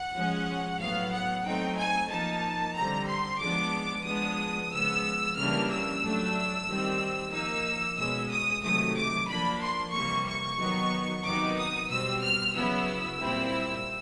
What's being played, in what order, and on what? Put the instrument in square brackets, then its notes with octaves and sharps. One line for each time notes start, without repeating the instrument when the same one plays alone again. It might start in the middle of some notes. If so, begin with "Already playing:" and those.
Already playing: [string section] F#5
F3 G#3 C#4
A2 F#3 B3 F5
F#5
F#3 A3 C4 D#4 G5
G#5
F3 A#3 D#4 A5
D3 G3 C4 A#5
C6
F3 G#3 B3 D4 D6
F3 G#3 B3 D4 D#6
C#3 F3 G#3 B3 E6
C#3 E3 G3 A#3 D4 F6
E6
A2 F#3 A3 D4
D#3 G3 C4
F3 A#3 D#4 E6
B2 G#3 C#4 E6
D#6
C3 D#3 F#3 A3 D#6
D6
F3 A#3 D4 B5
C6
C3 E3 G3 A#3 C#6
C#6
D#3 F#3 B3 D#4
C3 D#3 F#3 B3 D#4 D6
D#6
B2 G3 C4 E6
F6
C#3 F#3 B3 E4 E6
A#2 G3 C4 E4